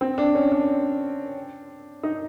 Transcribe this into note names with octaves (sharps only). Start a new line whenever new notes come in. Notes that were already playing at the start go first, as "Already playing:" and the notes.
C4
D4
C#4
D4
D#4